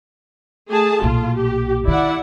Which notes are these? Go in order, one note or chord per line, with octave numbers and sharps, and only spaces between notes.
A3 G#4 A5
B1 A#2 F4
G4
D#3 E4 D5 F#5